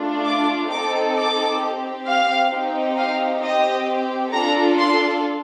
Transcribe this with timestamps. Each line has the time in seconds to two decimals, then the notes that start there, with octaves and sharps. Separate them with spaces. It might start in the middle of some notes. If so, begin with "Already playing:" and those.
Already playing: A3 D4 F4
0.25 D6
0.71 C4 D#4 A4 D6
1.16 D6
1.61 C4 G4
2.06 F5
2.51 C4 D#4 G4
2.97 F5
3.42 C4 G4 D#5
4.33 D4 F4 A4 A#5
4.78 C6